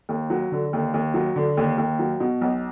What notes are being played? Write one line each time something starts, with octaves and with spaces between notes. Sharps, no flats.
D#2
F#3
D3
D#2
D#2
F#3
D3
D#2
D#2
F#3
B2
B1